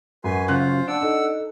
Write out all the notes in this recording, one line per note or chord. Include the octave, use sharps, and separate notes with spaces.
F#2 F#4 B4 G#5 C6
F#2 C#3 F4 C5 F#6
D4 F#5 A5 E6
D#4 A4